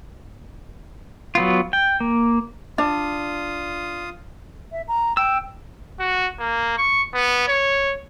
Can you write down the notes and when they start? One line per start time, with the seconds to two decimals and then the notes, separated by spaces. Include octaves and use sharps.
1.35 F#3 B3 F4
1.73 G5
2.00 A#3
2.78 D4 F4 D#6
4.72 E5
4.88 A#5
5.17 G5 E6
6.00 F#4
6.39 A#3
6.78 C#6
7.14 B3
7.48 C#5